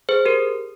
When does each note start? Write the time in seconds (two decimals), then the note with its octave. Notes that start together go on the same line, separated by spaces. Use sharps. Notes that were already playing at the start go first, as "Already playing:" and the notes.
0.09 G#4 C5
0.25 G4 A#4